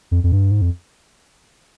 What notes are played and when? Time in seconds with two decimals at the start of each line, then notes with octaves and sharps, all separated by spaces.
0.11 F2
0.24 F2
0.32 G2
0.51 G#2
0.62 F2